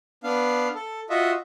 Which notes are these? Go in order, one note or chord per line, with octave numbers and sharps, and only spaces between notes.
B3 D4 F5
A4
F4 F#4 D#5 E5